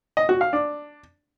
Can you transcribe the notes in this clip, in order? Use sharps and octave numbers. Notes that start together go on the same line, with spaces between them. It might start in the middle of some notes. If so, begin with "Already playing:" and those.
D#5
F#4
F5
D4